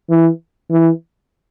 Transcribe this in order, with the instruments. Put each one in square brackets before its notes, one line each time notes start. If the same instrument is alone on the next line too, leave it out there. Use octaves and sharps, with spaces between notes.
[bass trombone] E3
E3